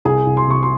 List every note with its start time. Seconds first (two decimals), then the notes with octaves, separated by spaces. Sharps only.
0.05 C2 G#4 G#5
0.26 C2
0.37 C6
0.47 C3 C#6
0.63 C6